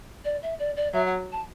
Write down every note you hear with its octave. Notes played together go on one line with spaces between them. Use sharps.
D5
E5
D5
D5
F#3 E5
F#5
A5